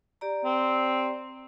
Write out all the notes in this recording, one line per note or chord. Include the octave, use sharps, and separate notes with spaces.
G4 D5 A#5
C4